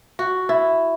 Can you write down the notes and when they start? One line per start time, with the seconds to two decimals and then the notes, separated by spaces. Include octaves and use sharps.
0.19 F#4
0.49 E4